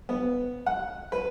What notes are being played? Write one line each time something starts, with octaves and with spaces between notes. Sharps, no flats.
B3
F#5
B4